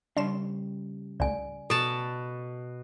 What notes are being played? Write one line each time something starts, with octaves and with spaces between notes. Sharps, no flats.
C#3 G3 D4 C6 E7
C#2 A2 D5 G#5
B2 A4 A5